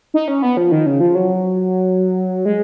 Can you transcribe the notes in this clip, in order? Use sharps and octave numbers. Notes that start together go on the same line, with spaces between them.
D#4
C#4
B3
F3
D#3
C#3
F3
F#3
G#3